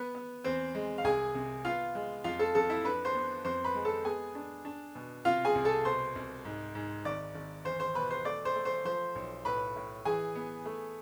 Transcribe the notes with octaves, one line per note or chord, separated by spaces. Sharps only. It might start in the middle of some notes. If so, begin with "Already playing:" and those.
Already playing: B3 B4
B3
E2 C4 C5
G#3
F5
C2 G#4 G#5
C3
B3 F4 F5
G#3
F2 F4 F5
A4 A5
F2 A4 A5
E4 E5
D4 B4 B5
C5 C6
B3
F2 C5 C6
B4 B5
G#3
A4 A5
B3 G#4 G#5
D4
D4
B2
C3 F4 F5
G#4 G#5
C2
A4 A5
B2 C5 C6
C2
G#2
G#2
G#1 D5 D6
G#1
E2 C5 C6
C5 C6
B2 B4 B5
C5 C6
A3 D5 D6
C5 C6
A3
C5 C6
F3 C5 C6
B1
A2 B4 B5
A2
E3 G#4 G#5
B3
A3